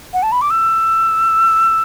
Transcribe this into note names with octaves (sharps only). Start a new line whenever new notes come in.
F#5
A5
B5
D6
E6